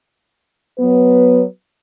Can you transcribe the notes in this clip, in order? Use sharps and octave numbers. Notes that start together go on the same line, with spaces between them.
F#3 B3 B4